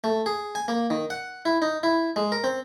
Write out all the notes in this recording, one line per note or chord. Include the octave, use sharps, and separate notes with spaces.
A3
G#4
G#5
A#3
D#3
F#5
E4
D#4
E4
G#3
A#4
C4